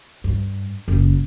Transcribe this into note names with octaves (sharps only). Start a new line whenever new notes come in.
G2
F#1